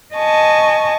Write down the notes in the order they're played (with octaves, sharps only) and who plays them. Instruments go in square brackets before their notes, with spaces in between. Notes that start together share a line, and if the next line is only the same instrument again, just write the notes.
[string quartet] D#5 G#5 A5 C#6